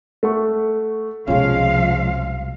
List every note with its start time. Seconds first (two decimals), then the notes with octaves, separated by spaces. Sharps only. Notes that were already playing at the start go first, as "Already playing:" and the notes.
0.23 A3 F#5 C#6
1.27 C2 B2 F3 G#3 C#4 F4 G#4 F5